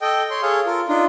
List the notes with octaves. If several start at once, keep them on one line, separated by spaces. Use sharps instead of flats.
A4 D#5 G5
C#5 C6
G#4 A4 C#5 F5
F4 A4 A#4
D4 D#4 F4